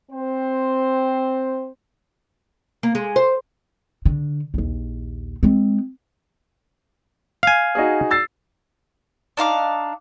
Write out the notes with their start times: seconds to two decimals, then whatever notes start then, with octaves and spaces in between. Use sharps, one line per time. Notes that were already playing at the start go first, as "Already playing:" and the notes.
0.11 C4 C5
2.83 A#3
2.95 G#3
3.16 C5
4.05 D3
4.54 A#1 D#2
5.43 G#3 C4
7.43 F5 G#5
7.75 D#4 F#4 G#4
8.11 E6 A6 C7
9.37 D4 D#4 F5 D6